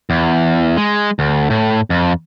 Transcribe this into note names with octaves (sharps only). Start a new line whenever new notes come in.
E2
G#3
D2
A2
F2